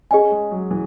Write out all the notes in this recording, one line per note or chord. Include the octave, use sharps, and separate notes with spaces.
C#4 G#4 D#5 G#5
G#3
F#3
E3